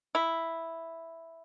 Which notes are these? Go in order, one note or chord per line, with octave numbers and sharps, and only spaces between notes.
E4